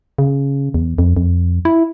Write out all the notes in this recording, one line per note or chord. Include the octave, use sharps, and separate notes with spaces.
C#3
E2
F2
F2
E4